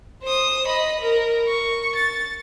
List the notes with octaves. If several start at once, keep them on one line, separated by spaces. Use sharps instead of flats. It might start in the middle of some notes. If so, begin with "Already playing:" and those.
C5 D#6
D#5 B5
A#4
C#6
A6